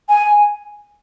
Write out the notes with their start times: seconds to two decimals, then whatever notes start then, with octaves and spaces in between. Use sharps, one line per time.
0.09 G#5